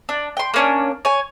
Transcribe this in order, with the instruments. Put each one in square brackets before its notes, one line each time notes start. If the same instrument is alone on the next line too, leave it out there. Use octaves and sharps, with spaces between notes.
[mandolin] D4
G5 C6
A#3 C#4 D4
C#5 G#5